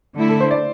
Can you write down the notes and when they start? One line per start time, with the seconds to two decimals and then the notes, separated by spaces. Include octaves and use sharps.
0.17 D3 A3 E4
0.29 A4
0.40 C5
0.51 D5